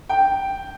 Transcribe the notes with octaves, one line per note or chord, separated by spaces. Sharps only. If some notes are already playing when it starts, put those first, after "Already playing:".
G5